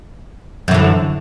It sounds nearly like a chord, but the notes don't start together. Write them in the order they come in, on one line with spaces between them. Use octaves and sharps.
F#2 E3 D3